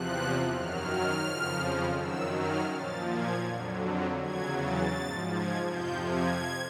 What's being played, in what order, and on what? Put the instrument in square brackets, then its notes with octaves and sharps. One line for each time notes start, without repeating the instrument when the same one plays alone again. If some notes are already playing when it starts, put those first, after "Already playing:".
Already playing: [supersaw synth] E2 C3 F3 F#6
F#2 D#3 F#3 F6
F2 C#3 F3
F#2 D#3 F#3 E6
F6
A#2 F3 A6
G#6
F2 D3 F#3
E2 C#3 F#3 G#6
A6
G#2 F3
G#6
F2 C3 F3 G6
G#6